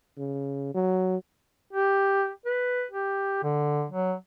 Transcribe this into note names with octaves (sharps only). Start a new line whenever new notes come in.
C#3
F#3
G4
B4
G4
D3
F#3